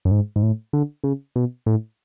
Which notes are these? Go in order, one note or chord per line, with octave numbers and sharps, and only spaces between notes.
F#2
G#2
G#2
A2
D3
C#3
B2
A2